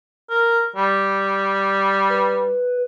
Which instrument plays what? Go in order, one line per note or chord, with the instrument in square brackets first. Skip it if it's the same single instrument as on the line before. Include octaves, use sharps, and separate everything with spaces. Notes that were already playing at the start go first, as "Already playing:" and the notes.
[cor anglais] A#4
G3
[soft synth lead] B4